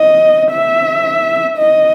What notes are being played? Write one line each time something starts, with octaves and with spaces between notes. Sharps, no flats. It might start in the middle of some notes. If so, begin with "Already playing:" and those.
Already playing: D#5
E5
D#5